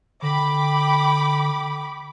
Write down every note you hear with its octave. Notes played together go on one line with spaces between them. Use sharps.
D3 G5 B5 D6